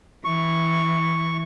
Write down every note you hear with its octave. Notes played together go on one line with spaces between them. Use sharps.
E3 C#6